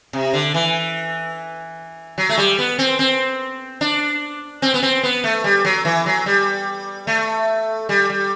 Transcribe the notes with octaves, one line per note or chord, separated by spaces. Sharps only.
C3
D3
E3
F#3
A3
G3
B3
C4
C4
D4
C4
B3
C4
B3
A3
G3
F#3
E3
F#3
G3
A3
G3
G3